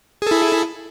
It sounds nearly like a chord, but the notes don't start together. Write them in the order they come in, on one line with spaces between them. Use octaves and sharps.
G#4 A4 E4